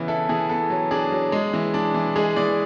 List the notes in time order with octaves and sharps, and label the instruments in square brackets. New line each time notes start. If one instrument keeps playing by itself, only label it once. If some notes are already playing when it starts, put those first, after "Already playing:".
Already playing: [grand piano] C#3 E3 B3
E4 A4
E3 G#4
B3 A4
F#3
D4 G#4
F#3
G#3
E3
D4
E3
G#3 G#4
E3 D5